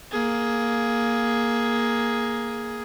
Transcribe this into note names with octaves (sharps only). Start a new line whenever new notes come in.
A#3 G#4